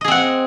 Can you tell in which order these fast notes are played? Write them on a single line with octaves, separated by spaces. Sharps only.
D#5 G#4 C4 F#5